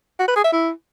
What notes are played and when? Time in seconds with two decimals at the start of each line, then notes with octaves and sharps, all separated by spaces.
0.20 F#4
0.28 B4
0.36 G#4
0.44 E5
0.53 E4